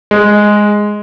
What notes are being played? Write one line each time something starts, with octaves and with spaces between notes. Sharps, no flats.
G#3